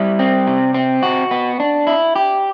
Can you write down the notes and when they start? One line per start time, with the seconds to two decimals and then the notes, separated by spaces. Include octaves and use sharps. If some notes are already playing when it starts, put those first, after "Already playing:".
Already playing: G3 E4
0.19 C4
0.47 C3
0.74 C4
1.03 F#4
1.31 B3
1.60 D4
1.87 E4
2.16 G4